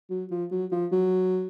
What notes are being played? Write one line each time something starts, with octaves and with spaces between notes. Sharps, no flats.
F#3
F3
F#3
F3
F#3